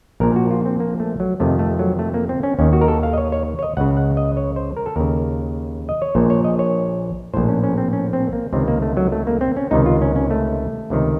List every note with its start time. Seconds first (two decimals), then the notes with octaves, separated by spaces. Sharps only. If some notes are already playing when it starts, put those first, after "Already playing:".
0.20 A#1 A#2 A#4
0.36 F#4
0.50 F4
0.66 C4
0.80 A#3
1.00 A3
1.20 F#3
1.40 F2 C3 D#3 A3
1.59 A3
1.79 F#3
1.99 A3
2.14 A#3
2.29 C4
2.43 C#4
2.59 D#2 D#3 C#4
2.73 F#4
2.81 A#4
2.88 A4
3.03 F5
3.13 D#5
3.18 C#5
3.32 C#5
3.59 C#5
3.63 D#5
3.77 C#2 C#3 F#5
3.97 F#5
4.17 D#5
4.37 C#5
4.56 C5
4.77 A#4
4.86 A4
4.96 D#2 C#3 A#4
5.89 D#5
6.02 C#5
6.15 A#1 A#2 C5
6.30 C#5
6.44 D#5
6.59 C#5
7.34 A#1 A2 C5
7.48 C#4
7.63 C#4
7.78 C4
7.93 C#4
8.13 C4
8.33 A#3
8.53 C#2 C3 D#3 C4
8.68 A#3
8.82 A3
8.97 F#3
9.12 A3
9.27 A#3
9.41 C4
9.57 C#4
9.71 C#2 C3 D#3 D#4
9.86 F4
10.02 C#4
10.16 C#4
10.31 A3
10.90 C#2 C3 D#3